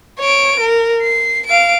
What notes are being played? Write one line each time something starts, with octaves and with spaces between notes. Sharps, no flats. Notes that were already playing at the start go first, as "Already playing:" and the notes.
C#5 D7
A#4
C7
F5 D7